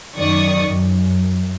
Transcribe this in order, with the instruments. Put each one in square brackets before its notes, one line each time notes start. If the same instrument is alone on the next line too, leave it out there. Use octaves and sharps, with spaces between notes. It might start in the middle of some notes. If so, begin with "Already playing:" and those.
[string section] F#2 D#3 D5 C#6 D#6
F#2